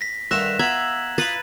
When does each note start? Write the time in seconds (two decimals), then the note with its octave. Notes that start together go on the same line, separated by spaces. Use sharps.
0.01 A#6 B6
0.31 G2 D3 D#3 E5 F#6 A#6 E7
0.59 B3 F4 E5 A#5 G#6 F#7
1.18 F4 B4 B5 D#6 A6